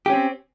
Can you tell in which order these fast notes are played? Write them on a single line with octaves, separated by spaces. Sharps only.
G4 C#4 C4